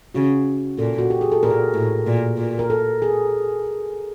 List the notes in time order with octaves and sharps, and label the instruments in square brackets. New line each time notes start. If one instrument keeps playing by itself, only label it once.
[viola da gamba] C#3 [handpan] F#4
[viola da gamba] A#2 [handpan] A4
[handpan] F#4
G4
G#4
A4
[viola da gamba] A#2 [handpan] A#4
[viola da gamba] A2
A#2
A#2
[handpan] A#4
A4
G#4